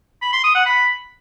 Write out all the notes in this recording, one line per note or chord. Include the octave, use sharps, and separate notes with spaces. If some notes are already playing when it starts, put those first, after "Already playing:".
B5
C6
D#6
F#5
B5